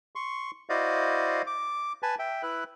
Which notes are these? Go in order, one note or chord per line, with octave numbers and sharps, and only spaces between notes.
C6 C#6
E4 F#4 C5 D5 D#5 F5
D6
B4 G#5 A5
E5 G5
E4 B4 F#6